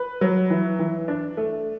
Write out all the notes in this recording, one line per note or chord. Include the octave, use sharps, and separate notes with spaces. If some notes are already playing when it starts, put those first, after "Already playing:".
Already playing: B4
F#3
E3
E3
D4
A3